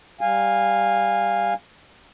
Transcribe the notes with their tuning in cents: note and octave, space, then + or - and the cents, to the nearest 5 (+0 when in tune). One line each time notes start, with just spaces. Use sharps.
G3 +0 F5 +0 G#5 -15